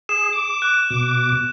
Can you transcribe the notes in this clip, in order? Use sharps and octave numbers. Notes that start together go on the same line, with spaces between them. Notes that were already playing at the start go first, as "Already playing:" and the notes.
G#4 E7
D6
F#6
B2 D6